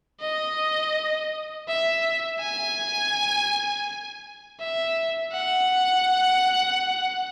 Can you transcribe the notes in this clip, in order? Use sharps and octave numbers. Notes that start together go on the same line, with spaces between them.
D#5
E5
G#5
E5
F#5